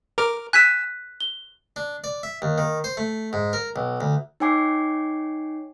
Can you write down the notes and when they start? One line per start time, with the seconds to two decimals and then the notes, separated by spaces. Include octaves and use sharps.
0.18 A#4 D6 F6
0.53 G#5 E6 F#6 B6 D#7
1.20 G7
1.76 D4
2.04 D5
2.23 E5
2.42 D#2
2.58 D#3
2.84 C5
2.97 A3
3.33 G#2
3.53 A#4
3.76 B1
4.01 D2
4.40 D#4 C#5 G5 G#5 D6 C7